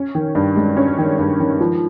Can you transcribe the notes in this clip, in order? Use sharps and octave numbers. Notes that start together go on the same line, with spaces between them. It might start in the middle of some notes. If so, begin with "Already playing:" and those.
Already playing: C#4
D#3
G2
G#3
C#4
D#3
G2
D#3
F3